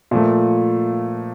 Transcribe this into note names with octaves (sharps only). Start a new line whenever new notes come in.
A#2 F3 A3